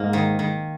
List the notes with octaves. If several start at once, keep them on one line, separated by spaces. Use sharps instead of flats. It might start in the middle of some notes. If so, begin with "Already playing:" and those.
Already playing: G#2 A#3
D#3
D#3